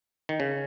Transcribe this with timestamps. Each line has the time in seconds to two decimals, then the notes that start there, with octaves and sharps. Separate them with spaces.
0.29 D#3
0.40 C#3